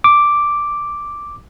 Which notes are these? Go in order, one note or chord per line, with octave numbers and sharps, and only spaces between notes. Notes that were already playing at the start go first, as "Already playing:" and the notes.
D6